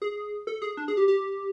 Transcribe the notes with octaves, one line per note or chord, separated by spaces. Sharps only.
G#4
A4
G#4
D4
G#4
G4
G4